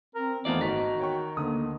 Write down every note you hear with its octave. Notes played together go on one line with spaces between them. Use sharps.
C4 A#4
E2 D#3 A3 B3 C4 D#4 F4 D5
G#1 D#4 F#4 B6
C#5 G5 C#6
D2 D3 A#3 D#6